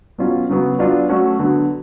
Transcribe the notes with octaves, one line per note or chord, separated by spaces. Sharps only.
B2 F#3 C#4 F4
C#3 F#3 B3 F#4
F#3 B3 D4 F4
F#3 A3 C#4 F#4
D3 F#3 B3